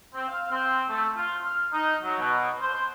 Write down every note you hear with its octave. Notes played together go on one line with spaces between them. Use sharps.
C4
F5
C4
A3
F4
F6
D#4
F#3
B2
C5
C5